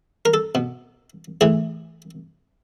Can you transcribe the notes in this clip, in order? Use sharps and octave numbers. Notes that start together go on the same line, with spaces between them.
A#4
A4
B2
A2 E3 G#4